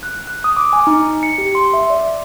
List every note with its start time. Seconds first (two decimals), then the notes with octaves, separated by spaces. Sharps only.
0.03 F#6
0.27 F#6
0.44 D#6
0.57 D6
0.73 G#5
0.87 D#4
1.23 C#7
1.38 G4
1.55 C6
1.74 E5
1.90 D5